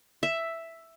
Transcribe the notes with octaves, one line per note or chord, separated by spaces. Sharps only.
E5